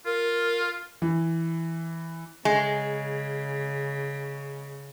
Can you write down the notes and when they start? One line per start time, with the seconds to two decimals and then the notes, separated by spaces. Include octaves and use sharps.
0.06 F4 A#4
1.02 E3
2.45 C#3 G#3